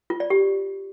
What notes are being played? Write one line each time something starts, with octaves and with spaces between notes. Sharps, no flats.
F4
D5
G4